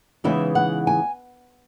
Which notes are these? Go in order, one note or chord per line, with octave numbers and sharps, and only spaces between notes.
C#3 E3 G#3 B3 D#4 E5
F#5
G#5